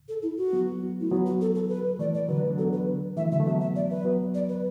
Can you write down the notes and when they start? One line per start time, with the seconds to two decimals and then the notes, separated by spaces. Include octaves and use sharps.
0.09 A4
0.23 E4
0.37 F#4
0.53 F#3 B3
1.00 A3 E4
1.11 F#3 B3 F#4
1.26 F#4
1.41 A4
1.55 A4
1.69 B4
1.99 E3 A3 D5
2.14 D5
2.29 D3 F#3 B4
2.50 D4
2.58 F#3 B3 A4
2.73 B4
3.17 E3 A3 E5
3.32 D3 F#3 E5
3.40 A3
3.46 F#3 B3 E5
3.61 E5
3.76 D5
3.91 B4
4.05 F#3 B3
4.35 D5
4.49 B4